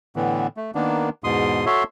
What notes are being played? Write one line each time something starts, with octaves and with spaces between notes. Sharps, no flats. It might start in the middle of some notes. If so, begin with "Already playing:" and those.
A2 D3 E3 B3
A3
D#3 A#3 B3 D4
E2 G#2 B2 C6 D#6
F#4 A4 C#5 E5 C6